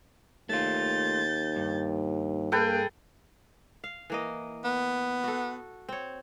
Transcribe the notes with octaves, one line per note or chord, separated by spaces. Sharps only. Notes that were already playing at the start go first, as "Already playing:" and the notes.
D#2 A3 F4 G6 A6
G2
A#3 G#4 A4 B4 G5
F5
E3 A#3 D#5
B3
F#4 A4
C4 C#5